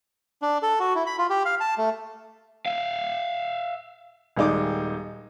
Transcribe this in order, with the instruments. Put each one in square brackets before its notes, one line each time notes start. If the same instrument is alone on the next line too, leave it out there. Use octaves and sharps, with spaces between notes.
[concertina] D4
A4
F#4
E4
B5
F4
G4
F5
A5
A3
[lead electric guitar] E5 F5
[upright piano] D#1 D#3 G#3 D#4 D5 D6